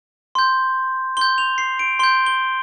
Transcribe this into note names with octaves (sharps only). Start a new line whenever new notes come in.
C6 G6
C6 G6 G7
F7
C7
D7
C6 G6 G7
G7